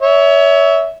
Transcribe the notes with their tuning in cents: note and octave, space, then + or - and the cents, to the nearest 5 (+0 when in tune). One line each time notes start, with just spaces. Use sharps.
C#5 +25 E5 -15